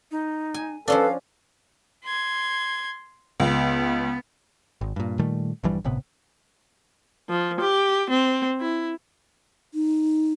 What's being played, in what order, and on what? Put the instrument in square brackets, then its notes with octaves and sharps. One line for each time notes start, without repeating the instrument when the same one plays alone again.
[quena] D#4
[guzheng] G#5
[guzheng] F3 C#4 D4 [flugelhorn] A4 [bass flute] B4 [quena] F5
[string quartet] C6 G#6
[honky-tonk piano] C#2 [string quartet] B3
[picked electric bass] G#1
G2 A#2
A#2 D#3 G3 A3
A#1 G2 E3 G3
G1 A2 C3 B3
[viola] F3
G4
C4
E4
[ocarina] D#4